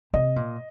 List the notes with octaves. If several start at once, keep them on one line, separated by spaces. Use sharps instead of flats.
C3 D#5
A#2